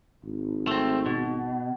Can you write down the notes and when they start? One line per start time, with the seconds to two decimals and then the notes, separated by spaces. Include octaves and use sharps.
0.23 G#1
0.67 A3 C4
1.06 B2